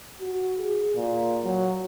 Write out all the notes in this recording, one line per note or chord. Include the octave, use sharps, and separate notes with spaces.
F#4
G#4
A#2
F#3